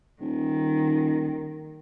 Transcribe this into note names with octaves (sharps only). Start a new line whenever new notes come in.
D#1 D#3